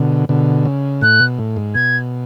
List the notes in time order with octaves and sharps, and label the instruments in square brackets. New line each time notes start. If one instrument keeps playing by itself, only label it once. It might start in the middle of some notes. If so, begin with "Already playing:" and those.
Already playing: [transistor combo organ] B2 D3
B2 D3
C#3
[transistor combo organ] A2 [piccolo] F#6
[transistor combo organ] B2
A2
G#2
[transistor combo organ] B2 [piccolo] G#6